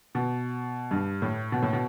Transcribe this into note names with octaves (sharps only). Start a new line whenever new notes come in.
B2
G2
A2
B2
A2
B2